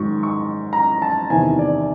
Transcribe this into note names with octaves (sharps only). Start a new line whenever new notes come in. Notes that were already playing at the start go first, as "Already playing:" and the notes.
Already playing: G#2 D#3 F#3 C#6
C#6
A#5
A5
E2 C3 D#3 G#5
D5